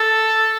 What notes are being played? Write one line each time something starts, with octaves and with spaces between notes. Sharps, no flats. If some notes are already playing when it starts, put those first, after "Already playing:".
Already playing: A4